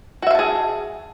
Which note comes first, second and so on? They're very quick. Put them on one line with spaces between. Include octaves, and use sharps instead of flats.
F#4 E5 F5 A5 G#4